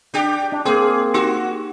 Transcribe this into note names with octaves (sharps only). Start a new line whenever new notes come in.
D4 G4
D4
A#3 C4 G#4
D#4 F#4 G4